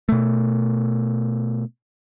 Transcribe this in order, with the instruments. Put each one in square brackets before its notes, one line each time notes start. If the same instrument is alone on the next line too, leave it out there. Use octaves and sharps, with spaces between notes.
[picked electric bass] B2 A3